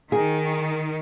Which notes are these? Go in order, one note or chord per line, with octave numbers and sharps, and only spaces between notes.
D#3 G#4